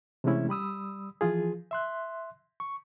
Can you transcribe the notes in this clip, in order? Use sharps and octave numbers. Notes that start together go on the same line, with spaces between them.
C3 E3 G#3 A3 C#4 E4
G3 B5 D#6 E6
E3 F3 F4 G#4
E5 C6 F#6
C#6